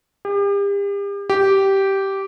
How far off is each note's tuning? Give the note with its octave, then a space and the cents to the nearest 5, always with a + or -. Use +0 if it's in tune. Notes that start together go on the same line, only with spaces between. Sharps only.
G4 +40
G4 -10